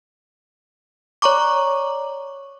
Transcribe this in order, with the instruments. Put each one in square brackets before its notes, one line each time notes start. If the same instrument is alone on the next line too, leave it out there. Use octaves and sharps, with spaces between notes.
[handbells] C#5 D5 A#5 C#6 D6